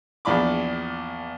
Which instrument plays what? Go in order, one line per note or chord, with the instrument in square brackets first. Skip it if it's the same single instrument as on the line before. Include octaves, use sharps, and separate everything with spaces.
[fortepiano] A#1 E2 D4 B5 D6